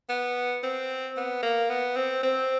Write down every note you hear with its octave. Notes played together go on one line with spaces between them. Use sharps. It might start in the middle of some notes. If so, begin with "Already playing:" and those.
B3
C4
B3
A#3
B3
C4
C4